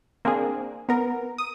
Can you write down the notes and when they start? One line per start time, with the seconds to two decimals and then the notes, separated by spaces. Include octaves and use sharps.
0.25 A#3 C4 D4 G#4
0.89 B3 A#4
1.38 D#6